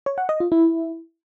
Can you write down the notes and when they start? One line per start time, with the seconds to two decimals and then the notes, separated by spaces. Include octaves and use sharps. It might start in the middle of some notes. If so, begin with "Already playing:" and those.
0.06 C#5
0.18 F#5
0.29 D#5
0.40 F4
0.52 E4